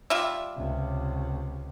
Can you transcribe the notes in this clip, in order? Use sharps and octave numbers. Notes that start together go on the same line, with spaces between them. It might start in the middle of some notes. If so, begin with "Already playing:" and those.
G3 F4 E5
C#2 C3